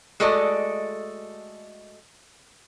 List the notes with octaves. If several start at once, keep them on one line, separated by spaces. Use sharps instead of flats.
G#3 A3 F#4 A4 D5 D#5